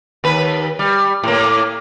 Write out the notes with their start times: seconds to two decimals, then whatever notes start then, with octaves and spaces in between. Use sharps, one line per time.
0.24 D#2 B4
0.79 G3
1.23 A2 A#3